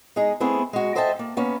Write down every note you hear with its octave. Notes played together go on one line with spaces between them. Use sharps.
G#3 D#4 G#4
A3 B3 C4 E4 G#4
G#3 F#4
A4 C5 D#5 E5 G5 A5
A#3
A#3 B3 C#4